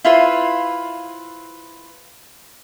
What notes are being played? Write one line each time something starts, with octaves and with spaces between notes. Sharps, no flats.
E4 F4 B4 C5